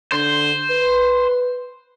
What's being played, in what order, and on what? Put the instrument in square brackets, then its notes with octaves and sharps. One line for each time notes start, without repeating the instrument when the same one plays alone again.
[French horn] D3 [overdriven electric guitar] C5
[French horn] B4